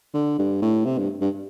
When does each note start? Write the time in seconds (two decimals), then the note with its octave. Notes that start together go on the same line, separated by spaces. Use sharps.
0.14 D3
0.39 G2
0.62 A2
0.85 C3
0.98 G2
1.21 G2